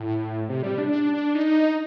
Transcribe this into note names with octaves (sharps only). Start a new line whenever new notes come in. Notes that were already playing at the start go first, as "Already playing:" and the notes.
Already playing: A2
C3
G3
D4
D4
D4
D#4